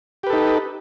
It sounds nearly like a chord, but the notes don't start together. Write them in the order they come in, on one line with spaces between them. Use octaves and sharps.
G4 B4 A4 D#4